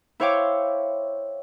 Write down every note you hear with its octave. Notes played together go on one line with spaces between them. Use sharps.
E4 C5 C#5 F5 G5 D6